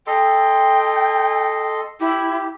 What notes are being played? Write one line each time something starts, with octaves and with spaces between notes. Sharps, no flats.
A4 D#5 G5 C6
E4 G4